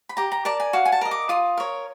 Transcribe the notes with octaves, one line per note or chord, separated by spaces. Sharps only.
B5
G4 A#5
A#5
A#4 D5 A5
G#5
F#4 F5
G#5
A5
A#4 D#5
D6
F4 D#6
A#4 C#5